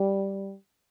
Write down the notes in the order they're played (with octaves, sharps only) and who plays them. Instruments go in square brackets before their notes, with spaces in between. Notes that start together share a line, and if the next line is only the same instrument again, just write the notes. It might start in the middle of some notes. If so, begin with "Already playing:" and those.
Already playing: [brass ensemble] G3